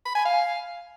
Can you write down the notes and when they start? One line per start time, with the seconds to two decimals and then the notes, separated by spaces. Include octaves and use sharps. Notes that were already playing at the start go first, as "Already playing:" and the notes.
0.05 B5
0.15 G#5
0.25 F5